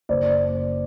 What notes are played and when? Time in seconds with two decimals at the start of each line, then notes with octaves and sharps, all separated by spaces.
0.09 F#1 C5 D5